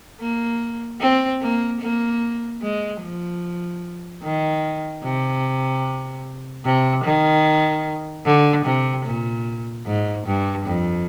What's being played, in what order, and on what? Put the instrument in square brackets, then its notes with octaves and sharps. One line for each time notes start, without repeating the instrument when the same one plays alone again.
[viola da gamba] A#3
C4
A#3
A#3
G#3
F3
D#3
C3
C3
D#3
D3
C3
A#2
G#2
G2
F2